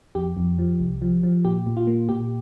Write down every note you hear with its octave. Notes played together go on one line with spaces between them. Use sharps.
F2 G4
F2
F3
C2
F3
F3
A#2 G4
A#2
F4
A#3
A#2 G4